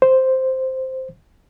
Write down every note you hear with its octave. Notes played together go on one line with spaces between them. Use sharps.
C5